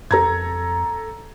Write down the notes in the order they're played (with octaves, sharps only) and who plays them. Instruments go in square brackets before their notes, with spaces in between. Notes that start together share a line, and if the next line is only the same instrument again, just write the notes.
[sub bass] F2 [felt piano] A4 A#5 G#6